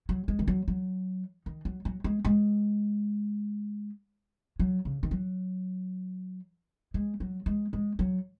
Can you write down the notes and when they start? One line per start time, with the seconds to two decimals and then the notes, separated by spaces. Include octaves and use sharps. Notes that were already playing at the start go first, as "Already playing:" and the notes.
0.09 F#3
0.28 G#3
0.39 D#3
0.48 F#3
0.68 F#3
1.46 D#3
1.65 F#3
1.85 F#3
2.04 G#3
2.25 G#3
4.59 F#3
4.85 C#3
5.03 D#3
5.11 F#3
6.94 G#3
7.20 F#3
7.46 G#3
7.73 G#3
7.99 F#3